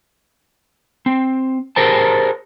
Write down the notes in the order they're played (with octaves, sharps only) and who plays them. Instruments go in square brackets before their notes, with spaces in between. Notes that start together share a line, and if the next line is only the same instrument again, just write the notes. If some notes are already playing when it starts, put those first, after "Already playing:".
[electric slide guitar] C4
G4 G#4 A#4 C5 A5